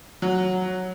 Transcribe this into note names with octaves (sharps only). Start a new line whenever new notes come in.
F#3